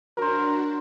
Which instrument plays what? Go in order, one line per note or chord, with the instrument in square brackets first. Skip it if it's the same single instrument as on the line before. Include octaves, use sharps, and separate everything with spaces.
[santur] F#3 C5 [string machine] D4 F#4 [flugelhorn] A#4